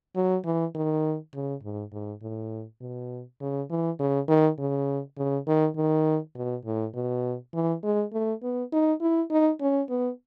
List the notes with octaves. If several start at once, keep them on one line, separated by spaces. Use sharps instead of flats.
F#3
E3
D#3
C#3
G#2
G#2
A2
B2
C#3
E3
C#3
D#3
C#3
C#3
D#3
D#3
B2
A2
B2
E3
G#3
A3
B3
D#4
E4
D#4
C#4
B3